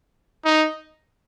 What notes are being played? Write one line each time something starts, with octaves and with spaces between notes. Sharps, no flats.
D#4